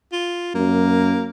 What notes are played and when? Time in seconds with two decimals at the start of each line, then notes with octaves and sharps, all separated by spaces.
0.12 F4
0.55 F#2 A#3